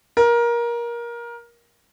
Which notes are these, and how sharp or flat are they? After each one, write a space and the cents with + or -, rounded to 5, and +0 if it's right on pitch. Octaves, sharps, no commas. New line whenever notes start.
A#4 +20